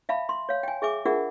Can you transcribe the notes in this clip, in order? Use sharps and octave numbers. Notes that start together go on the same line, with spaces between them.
E5 F5 A5 B5
C6
C#5 F5
G5 G#5
G#4 E5 G#5 D6
D4 F4 G#4 A#4 E5 F#5